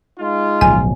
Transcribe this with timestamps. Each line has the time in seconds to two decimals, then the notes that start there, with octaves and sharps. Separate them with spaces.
0.19 G#3 D#4 F4
0.61 D1 B1 F3 G#5